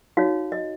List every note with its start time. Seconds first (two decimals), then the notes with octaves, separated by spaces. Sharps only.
0.17 D#4 F#4 C#5 F5
0.52 D#5